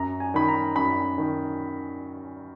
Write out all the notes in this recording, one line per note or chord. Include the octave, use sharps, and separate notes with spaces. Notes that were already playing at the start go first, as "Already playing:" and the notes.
Already playing: F#2 A#5
G#5
D#3 B5
A#5
F#2 B5
D#3